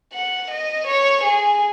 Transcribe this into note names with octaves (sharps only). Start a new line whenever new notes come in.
F#5
D#5
C#5
G#4